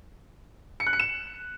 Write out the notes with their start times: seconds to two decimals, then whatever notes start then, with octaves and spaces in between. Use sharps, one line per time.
0.80 C#7
0.87 F#6
0.93 C#7
1.00 E7